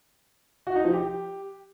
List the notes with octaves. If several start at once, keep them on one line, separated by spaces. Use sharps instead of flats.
F#4
D#4
F3
G4